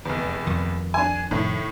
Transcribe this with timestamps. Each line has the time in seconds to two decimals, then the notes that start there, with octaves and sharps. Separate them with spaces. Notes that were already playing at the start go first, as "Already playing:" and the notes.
0.05 F1 E2
0.46 F2 D#3
0.94 D4 G#5
1.31 F1 A2 D#3